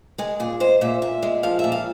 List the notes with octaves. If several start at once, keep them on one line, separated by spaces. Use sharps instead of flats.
G#3 G#4
A#2 G#4
G#3 C5
A#2 E5
A#2 E5
G#3
F3 F5
A#2 E5
F5